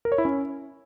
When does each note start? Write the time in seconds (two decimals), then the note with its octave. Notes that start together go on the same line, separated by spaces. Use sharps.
0.05 A#4
0.12 C#5
0.18 E4
0.25 C#4